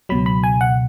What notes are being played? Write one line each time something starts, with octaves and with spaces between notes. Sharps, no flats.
C#2 B2 F#3 B5
B5
G#5
F#5